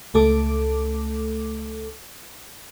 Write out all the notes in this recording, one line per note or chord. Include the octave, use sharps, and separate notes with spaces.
C#2 A3 A4 D6